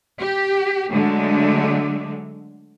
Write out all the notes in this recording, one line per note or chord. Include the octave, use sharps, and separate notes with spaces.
G4
D3 F#3 G#3 A3